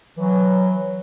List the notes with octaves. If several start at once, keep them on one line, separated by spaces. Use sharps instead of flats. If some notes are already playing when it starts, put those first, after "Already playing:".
E3 F#3